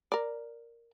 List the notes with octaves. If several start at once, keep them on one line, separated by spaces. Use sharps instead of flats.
A#4 D5